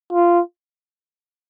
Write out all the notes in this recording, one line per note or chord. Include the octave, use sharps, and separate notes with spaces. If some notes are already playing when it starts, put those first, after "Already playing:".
F4